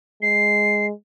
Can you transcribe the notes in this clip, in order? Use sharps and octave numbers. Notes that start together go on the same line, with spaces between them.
G#3 C7